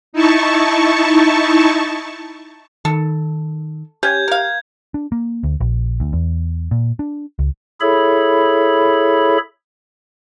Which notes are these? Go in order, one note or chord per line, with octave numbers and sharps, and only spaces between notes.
D#4 E4 A5 C#6
D#3 A4
C#4 G4 G6 G#6
A#4 F5
D4
A#3
D2
A#1
D2
E2
A#2
D4
C#2
E4 G#4 A4 C#5 E5 B5